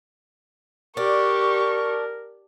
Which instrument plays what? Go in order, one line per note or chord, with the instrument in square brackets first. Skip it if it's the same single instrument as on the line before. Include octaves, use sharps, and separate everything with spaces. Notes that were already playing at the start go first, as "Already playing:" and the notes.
[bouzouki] D4 [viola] G4 [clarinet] A#4 [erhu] C#6